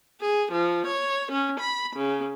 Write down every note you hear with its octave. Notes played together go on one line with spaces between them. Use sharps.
G#4
F3
C#5
C#4
B5
C#3